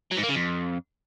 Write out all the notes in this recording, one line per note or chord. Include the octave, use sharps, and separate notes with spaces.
F#3
G#2
A#3
C#3
F2